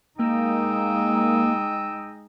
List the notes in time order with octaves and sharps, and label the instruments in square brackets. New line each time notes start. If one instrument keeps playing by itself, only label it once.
[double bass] G#3 D#4 [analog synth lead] A#3 [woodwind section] D#5 G5 E6